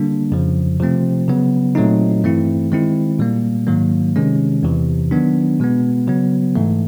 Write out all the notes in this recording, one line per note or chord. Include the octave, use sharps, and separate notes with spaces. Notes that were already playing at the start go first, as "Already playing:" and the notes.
Already playing: D3 G3 A#3 D4
F2 C#3 F3
C3 F3 A3 C4
C#3 F#3 B3
A#2 F#3 A3 C4 D#4
G2 E3 A3 C4 E4
D#3 G#3 C4 E4
A#2 G3 A#3
G#2 D#3 F#3 A#3
C3 D#3 G#3 C#4
E2 C3 E3
D#3 F#3 B3 D4
B2 G#3 B3
C#3 F#3 B3
G#2 E3 A3